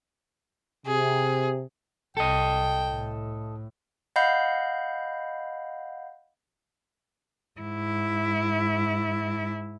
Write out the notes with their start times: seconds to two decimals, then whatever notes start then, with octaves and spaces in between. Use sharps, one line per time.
0.87 C3 G#4
2.17 C2 A4 D#5 G5
2.89 A2
4.16 D#5 F5 F#5 B5 G6 C7
7.60 G#2 E4